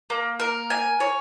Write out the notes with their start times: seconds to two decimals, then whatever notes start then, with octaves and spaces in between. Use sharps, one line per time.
0.10 A#3
0.40 A#4
0.70 G#5
1.00 C#5